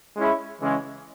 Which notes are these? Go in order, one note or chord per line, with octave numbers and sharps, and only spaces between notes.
G#3 C#4 E4 G#4
C#3 E3 G#3 C#4